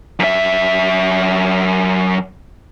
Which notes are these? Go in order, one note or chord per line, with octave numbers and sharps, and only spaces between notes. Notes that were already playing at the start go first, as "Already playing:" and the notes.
F#2 E5